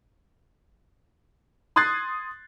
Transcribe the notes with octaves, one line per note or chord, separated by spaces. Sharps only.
C6 D#6 F#6 G#6 A6 C7